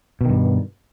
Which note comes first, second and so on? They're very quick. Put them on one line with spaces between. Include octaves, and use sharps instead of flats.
B2 D#3 G2